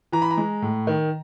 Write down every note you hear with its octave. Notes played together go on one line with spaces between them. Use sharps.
E3 A#5
B5
A#5
G#3
A2
D#3